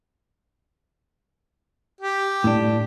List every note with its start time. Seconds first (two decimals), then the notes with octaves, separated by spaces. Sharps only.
2.01 G4
2.44 A2 D4